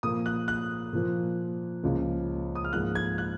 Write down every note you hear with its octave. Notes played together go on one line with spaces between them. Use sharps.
A#2 F3 A#3 D#6
F#6
F#6
A#2 F3 A#3
C#2 C#3 F3 A#3
D#6
F6
G#2 F3 A#3 F#6
G#6
F#6